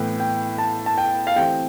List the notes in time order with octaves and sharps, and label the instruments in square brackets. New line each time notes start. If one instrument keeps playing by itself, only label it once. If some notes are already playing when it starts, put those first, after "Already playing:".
Already playing: [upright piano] A2 E3 B3 [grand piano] G5
[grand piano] G5
A5
A5
G5
F5
[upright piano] E3 A3 C4 G4 [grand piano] G5